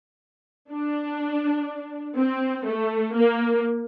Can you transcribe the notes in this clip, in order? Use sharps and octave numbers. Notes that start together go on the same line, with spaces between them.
D4
C4
A3
A#3